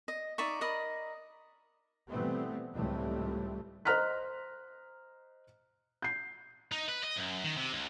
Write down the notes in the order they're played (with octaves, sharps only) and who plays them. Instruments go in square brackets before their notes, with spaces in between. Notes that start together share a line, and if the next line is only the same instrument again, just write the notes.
[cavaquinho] D#5
D#4 D5 E5 C#6
A#4 D5 D#5 B5
[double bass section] B2 E3 G3 A3 B3 C4
C#2 A2 E3 G3 A3 C4
[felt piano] C5 D#5 A#5 F6 F#6 B6
G6 C7
[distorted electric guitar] D#4
B4
D#5
F#2
D#3
C3
C#2